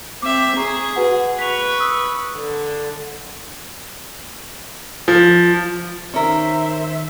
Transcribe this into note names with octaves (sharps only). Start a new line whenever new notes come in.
C4 E5 D6
G#4 A#5 C#6 C7
F#4 B4 F#5
B4 C#6 B6 F7
D#6 E6
D3
F3
D#3 C#4 A#4 C5 E5